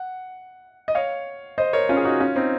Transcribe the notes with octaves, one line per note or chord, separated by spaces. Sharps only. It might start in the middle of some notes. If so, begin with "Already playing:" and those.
Already playing: F#5
D#5
C#5 F5
C5 D#5
A#4 C#5
C#4 F4
G#4
D#4 F#4
C#4 F4
C4 D#4